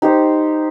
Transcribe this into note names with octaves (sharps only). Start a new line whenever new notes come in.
D#4 G4 C5